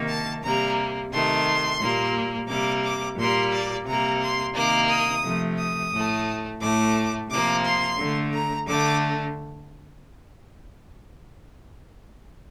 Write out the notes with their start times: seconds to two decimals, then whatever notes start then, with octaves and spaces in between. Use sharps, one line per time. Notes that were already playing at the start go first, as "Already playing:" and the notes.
Already playing: C3 D#3 A#3
0.08 A5
0.43 C3 G3 A#3 A#5
1.12 C3 D#3 A3 C6
1.81 A#2 G3 A#3
2.49 C3 G3 A#3 D6
2.84 D6
3.18 A#2 G3 A#3 C6
3.52 D5
3.86 C3 G3 A#3 A#5
4.21 C6
4.55 C3 D#3 A#3 D6
4.89 D#6
5.24 C3 F3 A3
5.58 D#6
5.93 A2 A3
6.61 A2 A3 D6
7.30 C3 F3 A#3 D6
7.65 C6
7.98 D3 A3
8.34 A#5
8.68 D3 A3 D6